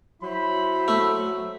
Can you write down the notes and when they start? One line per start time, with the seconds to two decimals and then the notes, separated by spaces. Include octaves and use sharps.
0.23 F#3 E4 C5 B5
0.88 A3